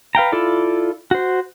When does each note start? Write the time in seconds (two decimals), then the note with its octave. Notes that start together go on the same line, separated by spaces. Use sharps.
0.15 B4 F5 G5 A#5
0.32 E4 F4 A4 D5
1.11 F#4 C5